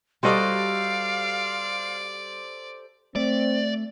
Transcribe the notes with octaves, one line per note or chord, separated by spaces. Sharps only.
G3 F#4 G4 A4 C5 D5 D#5 F5
A3 C4 D5